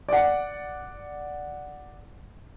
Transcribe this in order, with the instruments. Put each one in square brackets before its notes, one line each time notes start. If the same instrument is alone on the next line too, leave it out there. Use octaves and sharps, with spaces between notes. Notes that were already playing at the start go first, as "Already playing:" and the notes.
[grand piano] D5 F#5